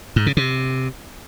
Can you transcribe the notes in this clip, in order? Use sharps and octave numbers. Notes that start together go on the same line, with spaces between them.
G#2
C#3
C3